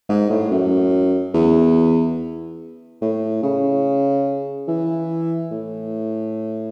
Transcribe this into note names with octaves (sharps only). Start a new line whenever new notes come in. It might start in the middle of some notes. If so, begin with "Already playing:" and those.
G#2
A2
F#2
E2
A2
C#3
E3
A2